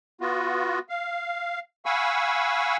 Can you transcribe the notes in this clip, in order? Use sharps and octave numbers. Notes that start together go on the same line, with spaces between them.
B3 F4 F#4
F5
F5 F#5 G#5 B5 C#6 E6